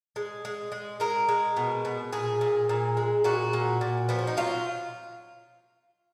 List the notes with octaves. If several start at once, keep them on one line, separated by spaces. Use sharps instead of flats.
G#3
G#3
G#3
G#3 A#4
G#3
B2
B2
A#2 G#4
A#2
A#2
G#3
A#2 F#4
A#2
A#2
F3 B3
C#4
D#4
F#3 F4